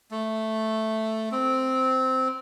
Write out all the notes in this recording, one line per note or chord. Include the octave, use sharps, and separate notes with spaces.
A3
C4